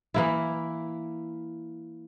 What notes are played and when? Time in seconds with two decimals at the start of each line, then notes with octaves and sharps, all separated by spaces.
0.14 E3 A#3 E4